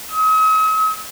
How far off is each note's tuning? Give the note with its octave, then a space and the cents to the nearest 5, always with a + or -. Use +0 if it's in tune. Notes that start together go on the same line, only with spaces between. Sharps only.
D#6 +45